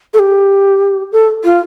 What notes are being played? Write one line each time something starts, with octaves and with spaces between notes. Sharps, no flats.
A4
G4
A4
F4